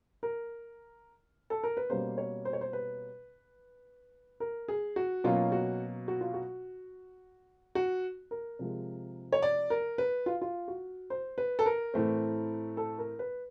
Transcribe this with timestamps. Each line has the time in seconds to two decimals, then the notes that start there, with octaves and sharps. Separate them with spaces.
0.23 A#4
1.50 A4
1.63 A#4
1.77 B4
1.90 B2 G3 A#3 C#4 C5
2.17 C#5
2.45 C5
2.53 C#5
2.61 C5
2.73 B4
4.40 A#4
4.68 G#4
4.96 F#4
5.24 B2 F#3 A#3 C#4 F4
5.52 F#4
6.08 F#4
6.21 F4
6.34 F#4
7.75 F#4
8.31 A#4
8.59 C3 F3 G#3
9.32 C#5
9.42 D5
9.70 A#4
9.98 B4
10.26 F4
10.42 F4
10.68 F#4
11.10 C5
11.38 B4
11.59 A4
11.66 A#4
11.94 A2 E3 A3 C4
12.77 A4
12.98 A#4
13.19 B4